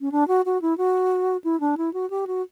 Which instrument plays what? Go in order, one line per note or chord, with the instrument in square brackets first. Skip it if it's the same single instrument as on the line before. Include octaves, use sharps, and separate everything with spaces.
[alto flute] C#4
D4
F#4
F#4
E4
F#4
E4
D4
E4
F#4
G4
F#4